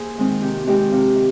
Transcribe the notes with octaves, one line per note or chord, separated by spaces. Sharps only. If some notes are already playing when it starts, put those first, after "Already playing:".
Already playing: A#3 G#4 A#4 C5
D#3 G#3 C4 D#4
C3 G4
D#3 G#3 C4 D#4 G4
C3 F4
D#3